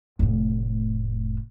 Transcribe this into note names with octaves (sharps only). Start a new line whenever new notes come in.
F1 A2